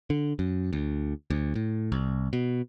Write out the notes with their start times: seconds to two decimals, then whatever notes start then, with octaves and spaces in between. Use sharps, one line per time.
0.10 D3
0.39 F#2
0.73 D2
1.30 D2
1.55 A2
1.92 C2
2.33 B2